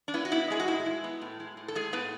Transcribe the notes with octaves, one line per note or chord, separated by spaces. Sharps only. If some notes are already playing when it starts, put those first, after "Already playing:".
D4
B3 E4
F#4
B3 E4
G#3 G#4
F#4
A2 E4
G#3
B3
A2
G#3
A2
A4
A2 G#3 G#4
A2 B3 B4